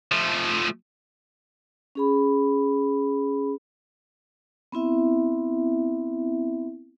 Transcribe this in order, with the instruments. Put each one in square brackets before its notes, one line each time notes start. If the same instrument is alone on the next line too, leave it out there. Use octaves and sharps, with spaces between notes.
[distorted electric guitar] F3 A3
[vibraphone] C#4 G#4 B5
B3 C4 E4 E5